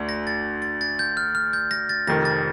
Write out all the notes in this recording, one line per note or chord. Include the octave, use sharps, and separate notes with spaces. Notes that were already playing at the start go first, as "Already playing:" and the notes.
Already playing: D2 D4
A#6
A6
A6
A6
G6
F6
F6
G6
A#6
A6
F1 F2 D#3 A#6
A6